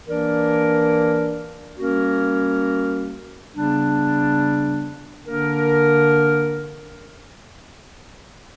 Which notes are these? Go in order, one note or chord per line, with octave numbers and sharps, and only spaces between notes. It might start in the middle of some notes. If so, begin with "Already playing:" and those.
E3 A#3 D4 A#4 D5
G3 A#3 C#4 F#4 A#4
C#3 G3 B3 D4
D3 A#3 D4 A#4